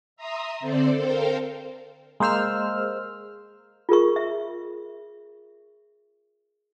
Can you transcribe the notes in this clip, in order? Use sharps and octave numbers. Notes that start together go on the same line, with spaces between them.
E5 A#5 C6 D#6
D3 C4 A4 C5 D5
A4 A#4 C5 F5 G5
G#3 A#3 C5 E6 F6
F4 G#4 A#4 C#6
E5